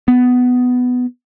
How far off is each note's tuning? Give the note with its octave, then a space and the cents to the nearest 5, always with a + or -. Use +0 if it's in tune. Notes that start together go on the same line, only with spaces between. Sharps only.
B3 +10